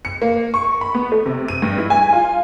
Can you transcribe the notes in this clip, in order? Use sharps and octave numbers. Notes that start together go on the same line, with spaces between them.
C#7
A#3
C#6
B5
B3
A3
C3
D#7
G2
E4
G#5
F4